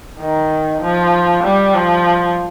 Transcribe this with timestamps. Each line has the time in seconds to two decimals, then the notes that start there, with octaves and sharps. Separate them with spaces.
0.20 D#3
0.82 F3
1.43 G3
1.74 F3